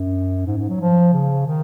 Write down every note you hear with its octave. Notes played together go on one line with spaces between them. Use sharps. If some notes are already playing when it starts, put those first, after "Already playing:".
Already playing: F#2
G#2
G#2
F#3
F3
C#3
D#3